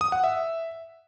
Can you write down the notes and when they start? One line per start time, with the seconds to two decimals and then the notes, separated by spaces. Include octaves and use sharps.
0.01 D#6
0.12 F#5
0.24 E5